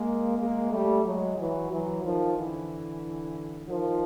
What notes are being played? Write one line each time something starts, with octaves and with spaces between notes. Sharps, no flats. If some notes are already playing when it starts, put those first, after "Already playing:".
Already playing: G#3 A#3
G#3 A#3
G3 A3
F#3 G#3
E3 F#3
E3 F#3
D#3 F3
D3 E3
D#3 F3